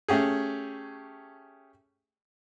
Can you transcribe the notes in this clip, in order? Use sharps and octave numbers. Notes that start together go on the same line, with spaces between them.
A3 C#4 G4 G#4